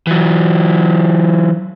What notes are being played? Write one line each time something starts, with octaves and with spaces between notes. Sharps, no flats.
E3 F#3